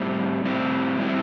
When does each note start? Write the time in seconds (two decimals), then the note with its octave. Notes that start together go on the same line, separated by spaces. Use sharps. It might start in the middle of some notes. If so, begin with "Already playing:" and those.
Already playing: A2 G3 C4 E4
0.44 A2 G3 C4 E4
0.97 A2 G3 C4 E4